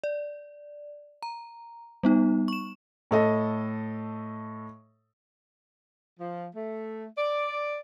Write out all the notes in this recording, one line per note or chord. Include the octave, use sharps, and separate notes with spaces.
D5
A#5
G3 B3 D#4
C#6 E7
A2 A4 D#5
F3
A3
D5